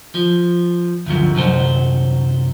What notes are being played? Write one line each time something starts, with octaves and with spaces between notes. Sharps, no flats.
F3
D2 G2 F3 F#3
C2 F#2 F#3 C5